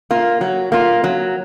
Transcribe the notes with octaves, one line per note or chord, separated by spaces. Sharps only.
A#3 F4
F#3
A#3 F4
F#3